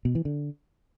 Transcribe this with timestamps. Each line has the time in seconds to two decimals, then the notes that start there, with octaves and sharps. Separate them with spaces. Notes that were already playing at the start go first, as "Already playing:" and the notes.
0.05 B2
0.15 E3
0.25 D3